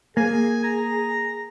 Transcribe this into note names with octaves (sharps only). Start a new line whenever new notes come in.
A#3 G#4 G#5
A#5